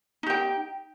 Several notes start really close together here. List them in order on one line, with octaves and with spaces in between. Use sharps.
D#4 G4 G5